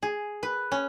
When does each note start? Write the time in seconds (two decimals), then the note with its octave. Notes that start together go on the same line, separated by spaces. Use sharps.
0.03 G#4
0.43 B4
0.72 C#4